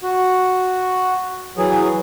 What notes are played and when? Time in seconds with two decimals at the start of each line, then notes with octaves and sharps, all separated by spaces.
0.03 F#4
1.57 E3 F#3 G#4